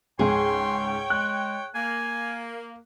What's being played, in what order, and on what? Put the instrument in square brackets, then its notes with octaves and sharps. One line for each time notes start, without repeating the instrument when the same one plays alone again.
[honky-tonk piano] C#2 G#2 [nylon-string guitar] G#4 [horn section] C#5 G5 [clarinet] C6
[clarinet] G#3 [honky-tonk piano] F#6
[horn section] A#3 [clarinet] G#5